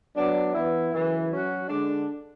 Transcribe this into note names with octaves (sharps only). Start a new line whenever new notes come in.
F#3 B3 D4
E3 B3 E4
F#2 C#3 E3
F#3 C#4 F#4
D3 G#3 D4